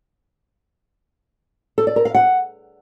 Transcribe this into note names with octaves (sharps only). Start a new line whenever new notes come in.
A4
D5
A#4
F5
F#5